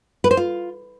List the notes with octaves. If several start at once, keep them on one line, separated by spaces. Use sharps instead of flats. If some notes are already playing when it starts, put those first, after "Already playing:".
B4
C5
F4